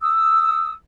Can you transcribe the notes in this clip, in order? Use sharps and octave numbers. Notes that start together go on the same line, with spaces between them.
D#6 E6